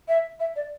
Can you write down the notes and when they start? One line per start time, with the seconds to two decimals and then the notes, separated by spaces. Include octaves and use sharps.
0.08 E5
0.40 E5
0.56 D5